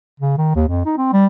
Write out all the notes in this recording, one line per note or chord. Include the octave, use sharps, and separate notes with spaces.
C#3
D#3
D#2
F2
D#4
C4
G3